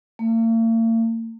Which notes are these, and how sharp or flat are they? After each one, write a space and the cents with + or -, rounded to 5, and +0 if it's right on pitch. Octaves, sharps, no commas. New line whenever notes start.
A#3 -45